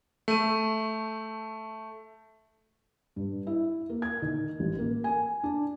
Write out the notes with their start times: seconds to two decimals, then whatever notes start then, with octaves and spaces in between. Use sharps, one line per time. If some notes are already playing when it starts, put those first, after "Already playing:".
0.28 A3 D#7
3.16 G2
3.47 E4
3.90 A#3
4.02 G#6
4.22 D#3
4.60 A1
4.79 A#3
5.04 G#5
5.44 D4